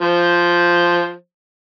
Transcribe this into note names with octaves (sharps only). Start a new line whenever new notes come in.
F3 C5